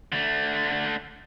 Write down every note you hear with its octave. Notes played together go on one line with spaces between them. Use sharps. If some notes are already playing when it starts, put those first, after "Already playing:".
D3 A3